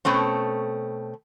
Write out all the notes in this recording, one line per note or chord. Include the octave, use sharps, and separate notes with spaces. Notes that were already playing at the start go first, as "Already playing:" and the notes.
B2 A3 C4 C#4